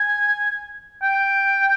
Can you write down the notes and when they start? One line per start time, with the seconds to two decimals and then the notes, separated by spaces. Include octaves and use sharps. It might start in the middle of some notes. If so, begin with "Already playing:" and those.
Already playing: G#5
1.03 G5